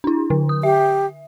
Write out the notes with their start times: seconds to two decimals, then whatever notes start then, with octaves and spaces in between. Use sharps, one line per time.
0.04 D4 E4
0.30 D3
0.49 D#6
0.63 G4 E5